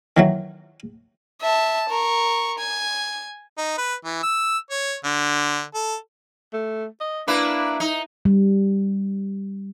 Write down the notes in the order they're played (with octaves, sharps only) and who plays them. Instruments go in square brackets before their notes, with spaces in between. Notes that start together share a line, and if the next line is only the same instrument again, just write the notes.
[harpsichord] D#3 E3 F#3
[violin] E5 A5
A#4 C#6
G#5
[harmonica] D#4
B4
E3
E6
C#5
D3
A4
[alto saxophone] A3
D#5
[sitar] A#3 E4 B4 [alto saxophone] D4
[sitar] D#4
[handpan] G3